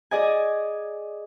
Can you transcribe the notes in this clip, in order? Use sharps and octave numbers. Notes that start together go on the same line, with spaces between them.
G#4 D5 D#5 G#5